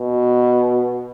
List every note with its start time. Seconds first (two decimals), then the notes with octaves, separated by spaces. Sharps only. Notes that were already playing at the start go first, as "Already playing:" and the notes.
Already playing: B2